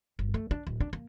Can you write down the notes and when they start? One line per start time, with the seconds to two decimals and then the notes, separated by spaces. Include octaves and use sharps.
0.19 G1
0.34 A3
0.51 D4
0.67 D1
0.80 D4
0.93 A#3